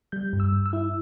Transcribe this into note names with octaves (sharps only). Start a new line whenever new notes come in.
G3 G6
G2
E6
G2
E6
E4